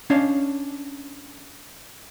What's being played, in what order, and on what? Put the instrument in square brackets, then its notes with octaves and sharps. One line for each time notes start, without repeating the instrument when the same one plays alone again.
[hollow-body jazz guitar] C#4 D4 D#5 F5